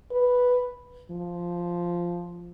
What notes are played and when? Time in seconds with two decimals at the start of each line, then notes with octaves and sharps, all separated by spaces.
0.12 B4
1.11 F3